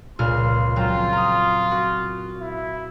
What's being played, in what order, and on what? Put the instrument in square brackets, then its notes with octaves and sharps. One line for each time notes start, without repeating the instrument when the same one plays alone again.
[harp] C#2 A#2 F6 [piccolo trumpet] C6
[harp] F#3 C4 A#5 [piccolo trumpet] F4
[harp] A#5 D#6
F#4
[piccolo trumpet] E4